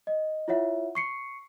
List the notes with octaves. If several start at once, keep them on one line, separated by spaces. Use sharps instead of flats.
D#5
E4 F4 C#5 E5 F#5
C#6 C7 C#7